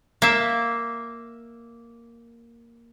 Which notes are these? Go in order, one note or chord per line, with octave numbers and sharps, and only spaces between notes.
A#3 E5